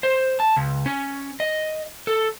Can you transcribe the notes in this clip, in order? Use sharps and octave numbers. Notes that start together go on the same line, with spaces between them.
C5
A5
C#2
C#4
D#5
A4